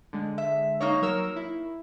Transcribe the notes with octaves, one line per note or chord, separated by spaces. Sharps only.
D3 G#3
E5
A#3 D#4 C#5
F#3 A#4 E6
E4